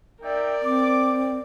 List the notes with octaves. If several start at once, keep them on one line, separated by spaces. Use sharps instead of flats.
D#4 A#4 D5 E5 G5
C4 D6